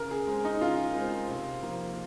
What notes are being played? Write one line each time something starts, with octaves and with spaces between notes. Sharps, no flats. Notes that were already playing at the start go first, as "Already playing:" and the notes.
Already playing: C#3 A#4
G#4
G#3 C4
D#4
C#3 F4
G#3 C4
C3
F3 A#3